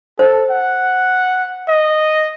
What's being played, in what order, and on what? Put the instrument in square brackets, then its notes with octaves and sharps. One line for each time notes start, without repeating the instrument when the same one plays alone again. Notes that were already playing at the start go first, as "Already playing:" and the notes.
[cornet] A4 [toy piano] C5
[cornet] F#5
D#5